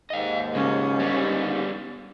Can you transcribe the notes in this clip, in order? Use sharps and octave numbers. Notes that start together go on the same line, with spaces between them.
D#2 G#2 D#5 F5
C#3 G#3 C#4
G3 B3